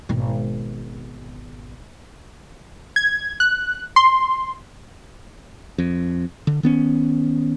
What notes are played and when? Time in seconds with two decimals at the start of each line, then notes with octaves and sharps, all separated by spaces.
0.09 G#1 B2
2.96 G#6
3.40 F#6
3.96 C6
5.78 F2
6.47 D3
6.63 D#3 B3 C#4